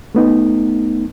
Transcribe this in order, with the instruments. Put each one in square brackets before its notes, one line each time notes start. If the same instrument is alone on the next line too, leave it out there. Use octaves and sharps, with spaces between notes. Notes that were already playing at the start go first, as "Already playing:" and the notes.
[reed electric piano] A3 B3 D#4